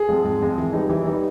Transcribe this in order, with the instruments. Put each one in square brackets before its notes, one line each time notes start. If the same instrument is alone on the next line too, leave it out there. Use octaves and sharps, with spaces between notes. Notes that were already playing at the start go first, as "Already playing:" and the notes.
Already playing: [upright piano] G#4
[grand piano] F3 G#3 C4
G#2
F3 G#3 C4
E3
G3 B3 D#4
E3
G3 B3 D#4